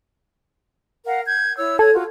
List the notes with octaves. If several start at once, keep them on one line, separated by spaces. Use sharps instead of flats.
A#4 F5 F#5
G6 G#6
E4 C#5 E6
A4 C#5 G#6
F4 F#4